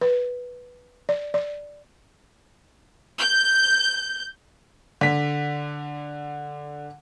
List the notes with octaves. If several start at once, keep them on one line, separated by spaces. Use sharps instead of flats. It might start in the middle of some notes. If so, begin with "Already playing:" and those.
B4
D5
D5
G6
D3 B6